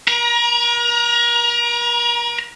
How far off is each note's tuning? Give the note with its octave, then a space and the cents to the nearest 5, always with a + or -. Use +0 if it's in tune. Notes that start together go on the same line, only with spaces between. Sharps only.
A#4 +45 A#5 +25